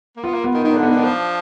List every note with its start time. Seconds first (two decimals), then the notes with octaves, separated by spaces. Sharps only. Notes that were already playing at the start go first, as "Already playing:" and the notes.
0.16 A#3
0.24 B3 F4
0.34 A#3
0.44 B3
0.54 D#3
0.64 D#3 D#4
0.73 D3 D4
0.83 B3
0.91 D3 D4
0.98 D#3
1.04 F3